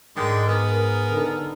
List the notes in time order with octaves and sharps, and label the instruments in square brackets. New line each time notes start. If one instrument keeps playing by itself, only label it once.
[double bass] G#2 [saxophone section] D3 D#3 G#3
[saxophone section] B3 G#4 A#4
[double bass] D3 D#4